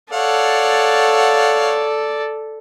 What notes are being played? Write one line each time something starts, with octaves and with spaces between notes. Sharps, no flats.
A4 C#5 D5 F5 F#5